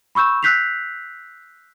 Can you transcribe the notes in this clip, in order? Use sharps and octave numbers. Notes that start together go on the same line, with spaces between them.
B5 C#6 E6 G6 E7
E6 F#6 G6 B6 C7 F7